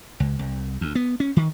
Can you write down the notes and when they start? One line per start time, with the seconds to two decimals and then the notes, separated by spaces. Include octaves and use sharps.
0.20 C#2
0.39 C2
0.81 D2
0.95 B3
1.20 C#4
1.36 D#3